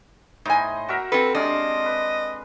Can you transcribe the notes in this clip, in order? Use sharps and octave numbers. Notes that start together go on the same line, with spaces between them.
A2 D#4 C5 D#5 G#5
F#4 A#4 E5
C4 A4 B4
C3 G#3 D4 D#5 F5
B4